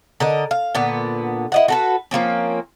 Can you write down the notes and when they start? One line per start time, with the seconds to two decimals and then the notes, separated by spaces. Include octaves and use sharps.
0.20 D3 A#4 D#5
0.51 F5
0.75 A#2 D3 B3
1.52 E4 D#5 F#5
1.68 F#4 A4 B4
2.11 F3 A#3 C4 C#4